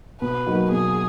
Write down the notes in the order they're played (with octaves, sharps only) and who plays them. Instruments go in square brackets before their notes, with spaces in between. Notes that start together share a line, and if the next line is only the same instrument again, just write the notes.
[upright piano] B2 [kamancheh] B4
[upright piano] F#3 A#3 D#4 F#4
[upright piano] B2 [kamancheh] G#4